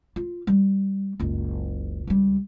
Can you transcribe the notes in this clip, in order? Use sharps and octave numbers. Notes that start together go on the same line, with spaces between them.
F4
G3
F#1 C#2
C#2 G3